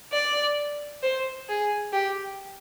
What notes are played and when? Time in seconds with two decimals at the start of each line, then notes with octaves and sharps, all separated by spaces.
0.13 D5
1.03 C5
1.49 G#4
1.93 G4